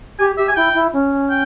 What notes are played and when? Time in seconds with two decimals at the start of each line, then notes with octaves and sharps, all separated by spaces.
0.19 G4 G#5
0.37 G4 E5
0.48 G#5
0.56 E4 G5
0.74 E4
0.93 C#4
1.30 G5